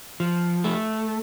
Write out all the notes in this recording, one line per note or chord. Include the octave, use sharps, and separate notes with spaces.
F3
A3